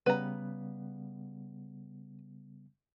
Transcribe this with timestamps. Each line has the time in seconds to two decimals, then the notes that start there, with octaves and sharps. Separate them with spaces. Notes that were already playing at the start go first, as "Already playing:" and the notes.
0.06 C#3 G3 B3 B4 A#5